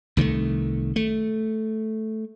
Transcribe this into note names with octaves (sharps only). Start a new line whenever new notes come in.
C2 D#3 F3 A3
A3